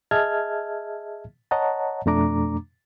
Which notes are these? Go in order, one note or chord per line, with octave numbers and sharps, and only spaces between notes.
G#4 D#5 E5 A5 F6 G#6
C#5 D#5 F#5 A5 A#5
F2 B2 A3 D4 A#5 D6